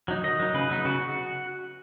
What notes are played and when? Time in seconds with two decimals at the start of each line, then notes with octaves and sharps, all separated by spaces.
0.08 F#3 D#4
0.24 D#3 D#5
0.39 F#3 D#4
0.54 C#3 B4
0.70 F#3 B3 D#4
0.85 C#3 F#4